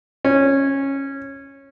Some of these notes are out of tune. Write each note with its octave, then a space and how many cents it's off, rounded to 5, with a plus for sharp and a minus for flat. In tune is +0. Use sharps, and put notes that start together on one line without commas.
C#4 -15